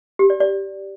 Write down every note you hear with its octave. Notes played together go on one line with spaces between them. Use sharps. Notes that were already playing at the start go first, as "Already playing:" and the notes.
G4
D5
D5